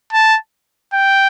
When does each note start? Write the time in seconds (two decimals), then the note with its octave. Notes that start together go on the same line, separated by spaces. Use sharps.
0.13 A5
0.93 G5